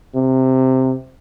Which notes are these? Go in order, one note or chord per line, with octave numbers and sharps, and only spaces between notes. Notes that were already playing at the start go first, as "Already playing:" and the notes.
C3